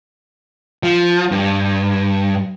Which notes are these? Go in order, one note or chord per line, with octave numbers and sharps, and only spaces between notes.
F3
G2